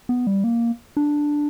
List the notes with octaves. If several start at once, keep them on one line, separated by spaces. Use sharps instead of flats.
B3
G3
A#3
D4